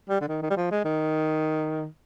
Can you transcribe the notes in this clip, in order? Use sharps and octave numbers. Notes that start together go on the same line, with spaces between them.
G3
D3
D#3
D#3
G3
F3
G#3
D#3